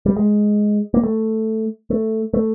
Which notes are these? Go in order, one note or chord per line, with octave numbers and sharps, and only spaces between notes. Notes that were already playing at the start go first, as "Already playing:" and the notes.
G3
G#3
A#3
A3
A3
A3